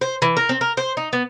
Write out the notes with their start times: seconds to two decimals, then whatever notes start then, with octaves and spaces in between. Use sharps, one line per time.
0.01 C5
0.22 E3
0.37 A#4
0.49 C4
0.61 A#4
0.77 C5
0.97 D#4
1.13 B3